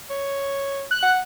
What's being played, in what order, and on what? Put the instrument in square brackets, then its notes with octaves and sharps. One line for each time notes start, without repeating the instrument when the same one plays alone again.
[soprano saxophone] C#5
[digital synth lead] F#6
[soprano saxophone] F#5